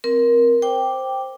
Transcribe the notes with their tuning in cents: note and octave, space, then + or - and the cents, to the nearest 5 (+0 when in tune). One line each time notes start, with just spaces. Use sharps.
C4 +0 A#4 +15
C5 +0 G5 +0 D6 +0